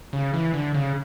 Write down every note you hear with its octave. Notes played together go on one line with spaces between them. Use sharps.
C#3
E3
D3
C#3